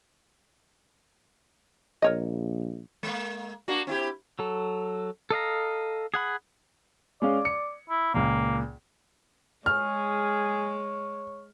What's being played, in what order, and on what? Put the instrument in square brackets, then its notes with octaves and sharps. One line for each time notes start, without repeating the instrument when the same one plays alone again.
[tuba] A#1 [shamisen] A#4 C#5 D#5
[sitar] G#3 A#3
A#3 D4 F#4
C4 E4 G4
[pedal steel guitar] F#3 A4
A4 D#5 F5 A#5
G#4 F#5 B5
[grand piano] G#3 C#4 F5 [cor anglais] D5
[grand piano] C#7
[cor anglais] E4
[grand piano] C#2 A#2 [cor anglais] A#3
[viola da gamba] G#3 [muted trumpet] G#4 [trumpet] C#5 [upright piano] F6